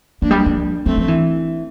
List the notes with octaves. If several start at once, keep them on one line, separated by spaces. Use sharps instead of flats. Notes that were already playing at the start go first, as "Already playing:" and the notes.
F3 A#3 D4
G3
F3
F3 A3 C4
F3
E3